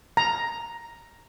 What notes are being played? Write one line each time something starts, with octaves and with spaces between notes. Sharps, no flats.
A#5